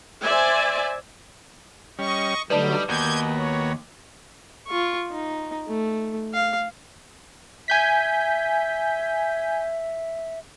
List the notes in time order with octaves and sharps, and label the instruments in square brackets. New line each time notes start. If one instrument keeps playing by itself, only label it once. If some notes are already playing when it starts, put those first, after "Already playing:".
[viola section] C5 D5 E5 G#5
[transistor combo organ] G3 C#4 [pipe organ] D#5 C#6
[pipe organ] D3 F#3 A3 [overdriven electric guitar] G3 [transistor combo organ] D#4 [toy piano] B4 D5 A5
[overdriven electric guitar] D#2 [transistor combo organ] B3 F#4 A#4 [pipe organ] G6 G#6
[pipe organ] C#5
[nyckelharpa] F4 C#6
D#4
A3
F5
[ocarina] E5 [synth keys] G#5 G6 B6